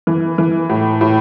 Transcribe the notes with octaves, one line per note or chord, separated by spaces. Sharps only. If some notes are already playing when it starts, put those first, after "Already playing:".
E3
E3
A2
A2